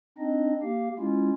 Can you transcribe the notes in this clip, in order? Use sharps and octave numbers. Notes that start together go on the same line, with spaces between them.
C4 D4 D#4 D#5
A#3 G4 F5
G#3 C#4 E4 F4